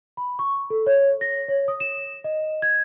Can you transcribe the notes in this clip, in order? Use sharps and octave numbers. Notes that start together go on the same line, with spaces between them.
B5
C#6
A4
C#5
A#6
C#5
D#6
E7
D#5
G#6